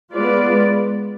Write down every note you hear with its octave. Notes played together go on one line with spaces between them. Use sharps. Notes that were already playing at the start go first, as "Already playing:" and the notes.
G#3 B3 F4 B4 D5